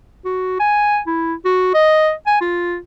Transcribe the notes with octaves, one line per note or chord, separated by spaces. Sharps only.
F#4
G#5
E4
F#4
D#5
G#5
F4